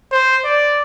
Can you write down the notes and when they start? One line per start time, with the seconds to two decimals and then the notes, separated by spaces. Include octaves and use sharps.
0.12 C5
0.45 D5